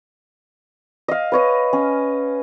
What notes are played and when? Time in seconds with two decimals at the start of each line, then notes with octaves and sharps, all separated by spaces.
1.08 D#5 F5
1.32 B4 C#5 D#5
1.73 C#4